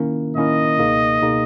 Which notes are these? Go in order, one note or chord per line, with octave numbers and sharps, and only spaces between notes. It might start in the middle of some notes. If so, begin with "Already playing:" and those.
Already playing: D#3 A#3 C#4 E4 A#4
D#3 A#3 C#4 E4 A#4 D#5
C#2 B2 A#3 D#4 G#4
B2 A#3 D#4 G#4